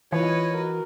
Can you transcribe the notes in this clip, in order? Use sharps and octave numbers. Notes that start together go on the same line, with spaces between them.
E3 F4 B4 C#5 D#5
F#4 A#4